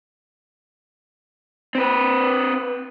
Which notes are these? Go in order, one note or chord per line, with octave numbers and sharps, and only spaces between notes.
C4 B4